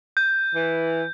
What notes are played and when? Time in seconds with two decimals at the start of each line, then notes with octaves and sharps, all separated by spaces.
0.17 G6
0.54 E3